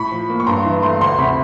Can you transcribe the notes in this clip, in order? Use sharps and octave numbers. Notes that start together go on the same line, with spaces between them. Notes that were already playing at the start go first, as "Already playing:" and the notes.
Already playing: A2 B5 C#6
F3
A#3
C#6
G2 A#5 C6
E3
A3 A#5 C6
D2 A#5 C6
C3 B5 C#6